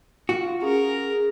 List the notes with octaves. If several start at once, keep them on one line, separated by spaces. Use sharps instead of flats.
F4 F#4
C#4 G#4 A#4